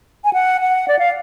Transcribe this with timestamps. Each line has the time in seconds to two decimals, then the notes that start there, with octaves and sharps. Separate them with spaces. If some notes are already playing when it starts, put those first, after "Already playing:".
0.24 G#5
0.33 F#5
0.61 F#5
0.88 D5
0.99 F5